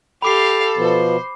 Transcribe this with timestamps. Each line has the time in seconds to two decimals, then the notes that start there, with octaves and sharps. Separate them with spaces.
0.22 G4 A4 F5 B5 D6 C7
0.77 B2 F3 B3 C5